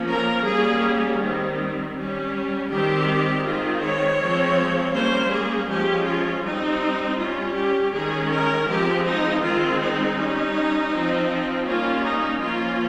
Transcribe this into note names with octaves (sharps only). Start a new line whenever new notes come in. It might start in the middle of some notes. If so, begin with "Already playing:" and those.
Already playing: F3 A#3 C#4
A#4
G3 A#3 C#4 G#4
D#3 G3 C4
G3 C#4
D#3 G3 C4 G4
D#3 G#3 C4 F4
C#5
F3 G#3 C4
G3 A#3 C#4 C5
G#4
F3 G#3 C#4 G4
F4
G3 C4 D#4
G3 C#4 F4
G4
D#3 G#3 C#4 G#4
A#4
F3 G#3 C4 G4
D#4
D#3 G#3 C4 F4
D#4
G3 C#4
F3 C4
G3 A#3 C#4 F4
D#4
F3 A#3 C#4 F4